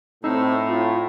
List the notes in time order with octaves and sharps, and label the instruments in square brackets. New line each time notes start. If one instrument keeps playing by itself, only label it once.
[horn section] A2 [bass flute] C4 [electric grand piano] D#4 [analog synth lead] E6
[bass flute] E4 [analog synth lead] F4